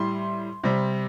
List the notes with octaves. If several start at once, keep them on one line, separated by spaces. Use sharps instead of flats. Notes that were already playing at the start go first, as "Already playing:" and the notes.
Already playing: A2 G3 C6
C3 G3